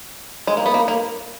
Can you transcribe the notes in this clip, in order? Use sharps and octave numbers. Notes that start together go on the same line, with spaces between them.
G#3
A#3
B3
A#3
A#3